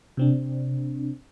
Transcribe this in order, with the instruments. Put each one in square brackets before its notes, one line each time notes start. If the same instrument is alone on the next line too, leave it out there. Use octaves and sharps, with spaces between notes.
[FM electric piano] C3 C4 D4